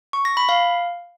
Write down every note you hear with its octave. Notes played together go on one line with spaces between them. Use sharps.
C#6
A#6
B5
F5